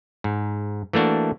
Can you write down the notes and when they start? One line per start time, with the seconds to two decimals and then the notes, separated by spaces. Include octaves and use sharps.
0.24 G#2
0.93 E3 A3 A#3 D4 F#4